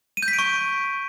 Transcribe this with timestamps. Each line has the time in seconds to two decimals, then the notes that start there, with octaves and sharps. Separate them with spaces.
0.17 D#7
0.22 G6
0.28 B6
0.33 D7
0.39 C#6